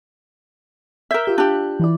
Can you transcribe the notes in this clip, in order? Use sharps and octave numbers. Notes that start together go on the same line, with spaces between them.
A#4 E5 E6 G6 B6
F4 G4 G6
D4 G4 F#6
E3 E4 D5